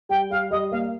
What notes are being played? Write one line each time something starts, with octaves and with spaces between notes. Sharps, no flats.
G3 G5
G3 F5
G3 D#5
A#3 F5